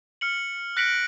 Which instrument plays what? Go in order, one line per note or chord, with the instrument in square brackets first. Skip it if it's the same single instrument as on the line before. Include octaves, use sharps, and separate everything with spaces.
[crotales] F6 C#7 F#7
F#6 A#6 B6 C#7 D7 F#7